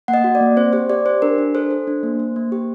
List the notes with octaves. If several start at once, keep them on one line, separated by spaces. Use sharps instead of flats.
A#3 F#5
D#5
F#4
D5
A#3
C4 C5
G4 C5
G4 D5
G4 C5
D4 A#4
D4
A4 C5
A4
D4
A#3
A#3
A#3
G4